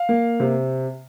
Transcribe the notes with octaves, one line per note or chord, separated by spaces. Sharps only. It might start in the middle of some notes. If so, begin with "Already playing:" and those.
Already playing: F5
A#3
C3